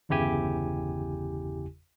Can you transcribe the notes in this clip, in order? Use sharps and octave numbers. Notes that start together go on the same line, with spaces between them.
G1 E2 C#3 E4 G4 G#5